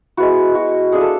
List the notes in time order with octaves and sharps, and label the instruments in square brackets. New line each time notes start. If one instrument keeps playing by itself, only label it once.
[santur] G#3 B3 E4 F#4
F#4
A3 D4 F4 G#4
A4